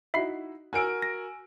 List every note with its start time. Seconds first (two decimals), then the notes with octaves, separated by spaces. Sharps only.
0.14 D#4 E4 F#4 E5 B5 C7
0.73 F#4 A#4 G#5 E6 D7
1.02 A#6